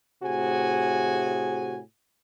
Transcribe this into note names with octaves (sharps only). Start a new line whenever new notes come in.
A2 C3 F#4 G#4 G#5